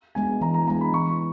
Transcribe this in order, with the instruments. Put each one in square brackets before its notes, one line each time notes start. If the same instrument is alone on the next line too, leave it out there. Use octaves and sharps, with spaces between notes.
[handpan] G#3 B3 [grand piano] G#5
[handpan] E3 [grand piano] A#5
[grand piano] A#5
[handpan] G#3 B3 [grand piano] A#5
[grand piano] B5
[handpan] E3 [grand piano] C#6